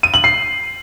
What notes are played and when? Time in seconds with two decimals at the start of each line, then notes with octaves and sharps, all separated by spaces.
0.03 D#7
0.14 F#7
0.24 C7